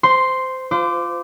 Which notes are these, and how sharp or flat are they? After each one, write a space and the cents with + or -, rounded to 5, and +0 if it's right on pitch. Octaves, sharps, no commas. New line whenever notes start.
C5 -15 C6 +0
F4 +0 C5 -35 D6 +0